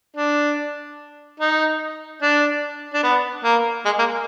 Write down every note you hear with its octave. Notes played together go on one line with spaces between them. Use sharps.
D4
D#4
D4
D4
B3
A#3
G#3
A#3